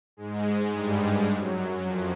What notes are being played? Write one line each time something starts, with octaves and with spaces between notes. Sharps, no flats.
G#2 G#3
G2 G3
F#2 F#3
F2 F3